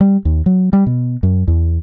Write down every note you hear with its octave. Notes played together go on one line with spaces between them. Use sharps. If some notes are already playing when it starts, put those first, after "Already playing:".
G3
D#2
F#3
G3
B2
F#2
E2